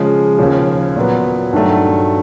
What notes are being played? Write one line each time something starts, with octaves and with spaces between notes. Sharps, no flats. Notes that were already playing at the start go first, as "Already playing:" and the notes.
Already playing: C#3 F3 G#3
D#2 C#3 F3
A#2 F#3 B3
G2 D#3 F#3 A3